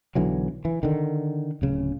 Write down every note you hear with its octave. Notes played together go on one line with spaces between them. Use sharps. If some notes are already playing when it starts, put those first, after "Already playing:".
B1 D3 E3 F#3
E3
D3 D#3
D1 C#3